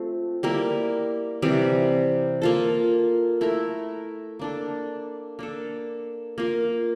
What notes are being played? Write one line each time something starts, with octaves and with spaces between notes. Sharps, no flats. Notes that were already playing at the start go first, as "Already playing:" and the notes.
Already playing: A3 C4 F4
G3 A#3 E4 A#4
C3 E3 G3 C4
A#3 F4 A4
A3 E4 A#4
A#3 D4 A4
A#3 D4 A4
A#3 F4 A#4